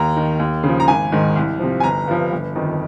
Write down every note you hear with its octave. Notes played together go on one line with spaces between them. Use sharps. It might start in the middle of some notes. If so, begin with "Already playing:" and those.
Already playing: D#2 A#5
D#3
D#2
C#3
F3
A#5
G#1 G#5
G#2 D#3
C2
C3 F3
G#5
G1 A#5
G2 F3
G1
F2 D#3